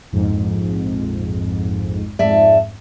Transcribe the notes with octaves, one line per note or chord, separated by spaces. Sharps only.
A#1 F2 G#2
F2 G#2 D5 E5 A5